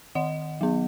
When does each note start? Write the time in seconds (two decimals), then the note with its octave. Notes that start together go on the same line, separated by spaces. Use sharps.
0.15 D#3 D#5 F#5
0.61 F#3 B3